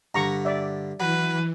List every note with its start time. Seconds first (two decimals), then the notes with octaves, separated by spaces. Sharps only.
0.15 G2 D3 A#5 C#6
0.45 D5 E5
1.00 E3 F#3 B4